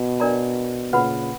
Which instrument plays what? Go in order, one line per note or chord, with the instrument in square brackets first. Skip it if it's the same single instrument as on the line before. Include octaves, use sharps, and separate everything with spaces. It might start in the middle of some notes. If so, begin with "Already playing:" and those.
Already playing: [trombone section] B2
[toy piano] D4 A#4 D5 A#5
[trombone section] A#2 C#3 [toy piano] B4 F#5 B5